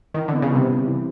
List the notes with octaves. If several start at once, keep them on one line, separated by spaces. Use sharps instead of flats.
D#3 E3
D3 B3
C#3
C3 G3
C3
E3